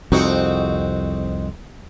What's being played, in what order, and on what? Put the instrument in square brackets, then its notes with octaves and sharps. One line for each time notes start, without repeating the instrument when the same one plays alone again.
[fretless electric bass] C2 F2 [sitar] C4 D#4 F#4